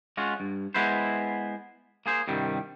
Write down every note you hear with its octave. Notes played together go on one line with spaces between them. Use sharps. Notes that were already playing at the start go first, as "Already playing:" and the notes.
G#3 C#4 F4 F#4
G2
G#3 B3 E4 B4 C5
A#3 G#4 C5
C2 G2 D#3 G3